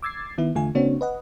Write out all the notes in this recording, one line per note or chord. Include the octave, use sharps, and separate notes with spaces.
D6 E6 G#6 A6 C7
D#3 B3 E4
E2 D3 A3 F4 G#5
C#3 A#3 C4 D4 F#4 C#5
B4 D#5 F#5